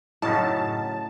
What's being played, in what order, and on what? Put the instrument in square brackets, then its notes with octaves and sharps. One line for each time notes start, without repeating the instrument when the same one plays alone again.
[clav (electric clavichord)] F#2 C#3 D#4 [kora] A2 [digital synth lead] A5